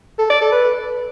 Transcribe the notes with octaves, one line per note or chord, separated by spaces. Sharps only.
A4
D5
A4
B4